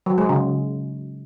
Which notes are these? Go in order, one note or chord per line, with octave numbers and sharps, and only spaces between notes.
F#3
G#3
C#3